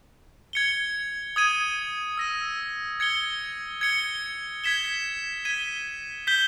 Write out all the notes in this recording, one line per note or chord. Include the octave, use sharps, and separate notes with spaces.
G#6 C#7 G7
D#6 G#6 D#7
E6 A#6 D#7
G#6 C#7 G7
G#6 C#7 G7
G#6 B6 E7 G7
G#6 B6 D#7 G7
G6 B6 G7